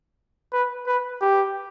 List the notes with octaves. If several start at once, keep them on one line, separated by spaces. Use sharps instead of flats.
B4
B4
G4